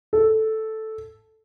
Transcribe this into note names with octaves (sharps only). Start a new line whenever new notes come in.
A4